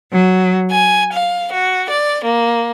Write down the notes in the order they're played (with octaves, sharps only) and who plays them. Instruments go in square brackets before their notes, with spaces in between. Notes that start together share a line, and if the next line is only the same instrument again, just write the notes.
[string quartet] F#3
G#5
F5
F#4
D5
A#3